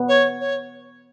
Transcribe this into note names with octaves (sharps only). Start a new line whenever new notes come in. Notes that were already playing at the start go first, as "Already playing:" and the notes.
Already playing: B3
C#5
C#5